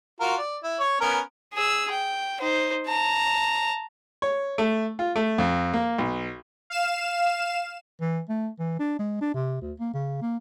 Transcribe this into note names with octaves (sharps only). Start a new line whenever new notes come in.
F4 F#4 A#4
D5
E4
C#5
B3 C#4 A#4
G#4 E6
G5
D#4 C5
A5 A#5
C#5
A3
F4
A3
F2
A#3
B1
F5 E7
E3
A3
E3
D4
G#3
D4
C3
D2
A#3
C#3
A#3